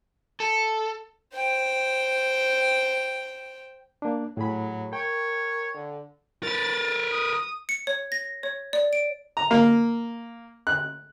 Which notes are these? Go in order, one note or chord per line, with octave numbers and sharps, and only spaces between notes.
A4
C5 G5
A#3 D4
A2 F#3 G#4 B5
A#4 C#5 G5
D3
A#4 B4 A6
D#6
C#7
C#5
A#6
C#5
D5
D7
A#5
A#3
F#6